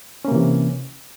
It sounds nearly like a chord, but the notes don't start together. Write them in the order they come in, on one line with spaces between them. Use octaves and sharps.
C#4 A#3 C3 E3